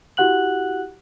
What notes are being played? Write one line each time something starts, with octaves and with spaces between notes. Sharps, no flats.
E4 F#4 G4 F#5 F#6 F#7